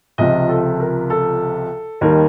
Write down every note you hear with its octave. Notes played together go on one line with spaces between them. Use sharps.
C#2 C3 F3 D#5
A4
A#4
A4
D#2 D#3 G3 A#4